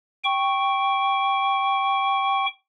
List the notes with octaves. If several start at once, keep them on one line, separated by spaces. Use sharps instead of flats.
G5 C#6